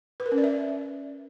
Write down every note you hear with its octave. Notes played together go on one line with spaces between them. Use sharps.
B4
A#4
C#4
D5
E5